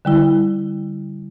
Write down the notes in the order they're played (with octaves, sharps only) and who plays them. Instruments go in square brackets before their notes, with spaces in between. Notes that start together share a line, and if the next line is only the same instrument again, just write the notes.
[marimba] D3 G3 E4